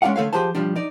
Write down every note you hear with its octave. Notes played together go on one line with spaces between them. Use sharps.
G#3 C#4 F#4 D5 F5 F#5
D3 A3 A4 C#5 F5
F3 G4 G#4 C5 A5
B1 F3 G3 D4
D#4 D5